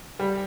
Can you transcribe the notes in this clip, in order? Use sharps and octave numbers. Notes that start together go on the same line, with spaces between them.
G3